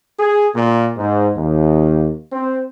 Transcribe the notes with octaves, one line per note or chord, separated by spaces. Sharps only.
G#4
A#2
G#2
D#2
C4